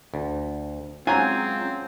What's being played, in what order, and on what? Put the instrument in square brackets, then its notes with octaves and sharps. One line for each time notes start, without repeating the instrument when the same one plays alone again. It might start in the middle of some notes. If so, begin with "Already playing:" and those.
[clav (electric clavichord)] D2
[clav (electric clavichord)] F#3 [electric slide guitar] G#3 C#4 F4 [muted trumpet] C4 [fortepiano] G#5 A#5